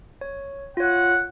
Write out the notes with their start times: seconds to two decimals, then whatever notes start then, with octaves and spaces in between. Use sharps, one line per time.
0.21 C#5
0.77 F4 C#5 F#5